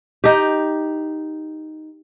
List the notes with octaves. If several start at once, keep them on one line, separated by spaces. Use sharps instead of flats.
D#4 G4